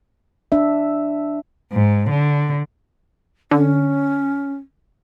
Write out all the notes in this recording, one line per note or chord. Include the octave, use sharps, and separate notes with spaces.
D4 E5
G#2
D3
D3 C#4